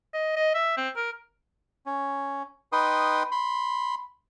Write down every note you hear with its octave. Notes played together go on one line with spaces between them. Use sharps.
D#5
D#5
E5
C4
A#4
C#4
D#4 B4 G5 C6 D#6
B5 C6